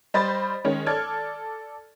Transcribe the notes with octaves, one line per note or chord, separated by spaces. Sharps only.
G3 C5 D#5 B5 C6 A6
D#3 G#3 C#4 C#5
A4 D5 F6 G#6